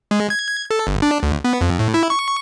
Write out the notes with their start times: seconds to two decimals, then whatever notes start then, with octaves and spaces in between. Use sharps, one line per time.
0.11 G#3
0.30 G#6
0.71 A4
0.87 G1
1.02 D4
1.23 D2
1.44 B3
1.61 F2
1.79 A2
1.94 E4
2.10 C#6